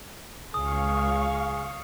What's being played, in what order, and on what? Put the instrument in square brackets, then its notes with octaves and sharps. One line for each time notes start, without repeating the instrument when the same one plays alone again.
[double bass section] C#2 [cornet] G#4 [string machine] F5 C#6 [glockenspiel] D#6